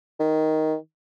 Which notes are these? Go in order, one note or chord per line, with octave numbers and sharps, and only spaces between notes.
D#3